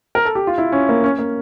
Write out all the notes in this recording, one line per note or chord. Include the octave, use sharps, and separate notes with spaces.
A#4
A4
G4
F4
E4
C#4
A#3
C#4
A#3